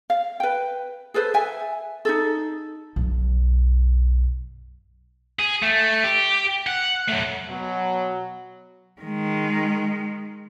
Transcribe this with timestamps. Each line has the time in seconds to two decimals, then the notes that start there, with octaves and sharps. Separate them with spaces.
0.10 F5
0.40 B4 G5
1.14 G#4 A4 B4 C5
1.34 E5 G#5
2.05 D#4 G#4 A4
2.96 B1 F#2
5.39 G#4
5.62 A3
6.04 G4
6.67 F#5
7.08 F#3 A3
7.49 B2 F#3
9.02 D#3 G#3